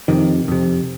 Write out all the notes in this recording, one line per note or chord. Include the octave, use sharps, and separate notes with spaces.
F2 C3 D#3
F2 C3